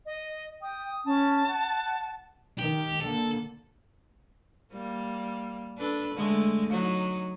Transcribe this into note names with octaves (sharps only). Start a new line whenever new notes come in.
D#5
G5 D#6
C#4 A5
F#5
D#3 G4
D3 A#3 A4
G3 A#3
D4 A4 B4
D3 G#3 A3
F#3 D#4